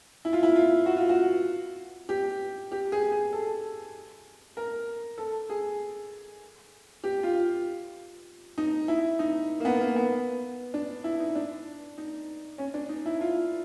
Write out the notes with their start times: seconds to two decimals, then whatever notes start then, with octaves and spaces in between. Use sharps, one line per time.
0.25 E4
0.33 F4
0.43 E4
0.56 F4
0.86 F#4
0.97 F4
1.09 F#4
2.09 G4
2.72 G4
2.92 G#4
3.12 G#4
3.33 A4
4.57 A#4
5.18 A4
5.50 G#4
7.04 G4
7.23 F4
8.58 D#4
8.88 E4
9.19 D#4
9.60 A#3
9.65 B3
9.81 A#3
9.96 B3
10.74 D4
11.04 E4
11.20 D#4
11.35 D4
11.98 D#4
12.58 C#4
12.74 D4
12.89 D#4
13.06 E4
13.21 F4